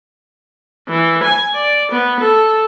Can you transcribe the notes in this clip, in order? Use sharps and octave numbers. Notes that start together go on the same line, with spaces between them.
E3
G#5
D5
B3
A4